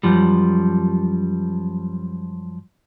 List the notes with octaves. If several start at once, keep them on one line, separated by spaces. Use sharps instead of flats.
F#2 F3 G3